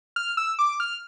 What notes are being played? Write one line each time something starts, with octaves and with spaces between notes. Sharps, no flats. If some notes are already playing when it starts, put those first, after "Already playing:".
F6
E6
D6
F6